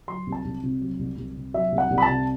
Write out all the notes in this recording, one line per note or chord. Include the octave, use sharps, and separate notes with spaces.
F#3 C6
C2
A5
C2
C3
F#3
C2
C2
C3
F#3 E5
C2
F#5
C2
B5
A5
C3